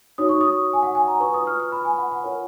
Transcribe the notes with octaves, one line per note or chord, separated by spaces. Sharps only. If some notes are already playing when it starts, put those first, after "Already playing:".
D#4 F#4 C#5 D#6
C#6
D#6
G#5
F#5
G#5
A#5
F4 B4 C#6
D#6
F6
F6
B5
G#5
F#5
F#5
F4 A#4 C#5